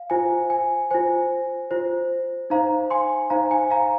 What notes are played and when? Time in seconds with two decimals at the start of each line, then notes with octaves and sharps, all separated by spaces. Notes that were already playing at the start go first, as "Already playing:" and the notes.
Already playing: F5
0.10 F4 C5 G#5
0.50 G#5
0.91 F4 C5 G#5
1.71 F4 C5
2.50 D#4 C5 F5 A#5
2.90 G#5 C6
3.30 D#4 C5 F5 A#5
3.51 G#5
3.71 F5 A#5